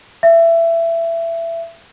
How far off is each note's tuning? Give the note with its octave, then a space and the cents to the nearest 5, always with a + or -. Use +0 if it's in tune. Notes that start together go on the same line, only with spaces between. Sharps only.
E5 +20